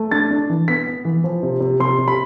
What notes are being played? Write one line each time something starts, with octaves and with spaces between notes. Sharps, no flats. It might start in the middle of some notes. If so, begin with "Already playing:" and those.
Already playing: A3
D4 A6
D4
E3
B3 B6
B3
E3
F3
C3
C3
C3 C6
C3
B5